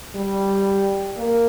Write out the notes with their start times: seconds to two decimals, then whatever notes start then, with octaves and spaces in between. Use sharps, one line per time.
0.15 G3
1.18 A#3